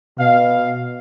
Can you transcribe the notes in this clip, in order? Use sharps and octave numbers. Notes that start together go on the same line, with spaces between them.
B2 F5